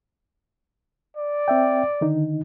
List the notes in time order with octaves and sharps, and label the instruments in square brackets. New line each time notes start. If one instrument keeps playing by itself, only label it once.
[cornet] D5
[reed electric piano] C4 E5 G5
D3 D#3 D#4